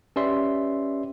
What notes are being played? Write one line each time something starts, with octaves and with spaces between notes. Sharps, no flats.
C#4 G4 B4 D5 E5 C6